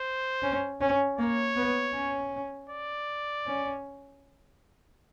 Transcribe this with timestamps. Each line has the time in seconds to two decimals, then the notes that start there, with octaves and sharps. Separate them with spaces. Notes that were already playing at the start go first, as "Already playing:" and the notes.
Already playing: C5
0.42 C#4
0.81 C#4
1.18 A#3 C#5
1.56 B3
1.94 C#4
2.70 D5
3.46 C#4